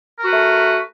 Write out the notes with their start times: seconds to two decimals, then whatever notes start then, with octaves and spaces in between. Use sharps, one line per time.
0.18 A#4
0.22 F#4
0.27 B4
0.32 A3